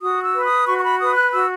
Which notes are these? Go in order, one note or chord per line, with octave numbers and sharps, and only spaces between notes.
F#4 D#6
E6
B4
D#6
F#4 C#6
C#6
B5
B4 D#6
F#6
F#4 E6